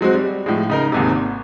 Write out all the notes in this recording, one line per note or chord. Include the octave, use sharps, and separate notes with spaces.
F#3 G#3 C4 F#4
G3
A2 F3 G#3
C#3 D#4 A#4
D#2 G#2 C3
G#1